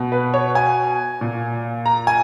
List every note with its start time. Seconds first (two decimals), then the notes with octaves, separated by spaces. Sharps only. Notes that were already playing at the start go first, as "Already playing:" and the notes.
Already playing: B2
0.12 B4
0.34 C#5
0.55 G#5
1.21 A#2
1.86 A#5
2.07 G#5